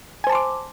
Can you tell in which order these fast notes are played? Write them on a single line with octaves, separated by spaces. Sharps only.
G#5 C5 A5 C6 D6